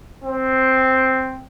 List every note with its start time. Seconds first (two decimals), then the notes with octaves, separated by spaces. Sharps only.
0.24 C4